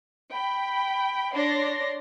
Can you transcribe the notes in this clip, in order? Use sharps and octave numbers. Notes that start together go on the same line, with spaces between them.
G5 B5
D4 C#5 D5 C6 A#6